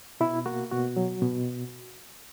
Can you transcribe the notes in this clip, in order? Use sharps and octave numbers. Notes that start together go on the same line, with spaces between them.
B2 E4
A#3 F#4
B2 F#4
F#3
B2